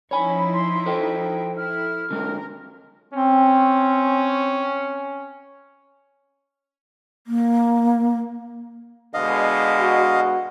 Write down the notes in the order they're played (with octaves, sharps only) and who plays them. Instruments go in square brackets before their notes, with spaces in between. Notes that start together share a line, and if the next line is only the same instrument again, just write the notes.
[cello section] F3 D#4 E4 [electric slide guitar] C#5 G#5 [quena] B5
[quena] C6
[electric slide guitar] A4 C5 [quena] G5
[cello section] E4 [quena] F6
[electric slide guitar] D3 G#3 [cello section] A#4
[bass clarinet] C4 [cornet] C#4
[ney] A#3
[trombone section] B2 D3 G#3 [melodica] D#5 F5
[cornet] F#4